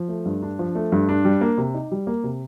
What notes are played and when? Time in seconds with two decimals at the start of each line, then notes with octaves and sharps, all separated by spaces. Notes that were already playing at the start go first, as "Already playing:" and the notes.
Already playing: F3
0.09 A3
0.26 G2
0.42 D4
0.59 F3
0.75 A3
0.92 G2
1.09 D4
1.25 G3
1.41 A#3
1.58 C3
1.74 D#4
1.92 G3
2.07 A#3
2.24 C3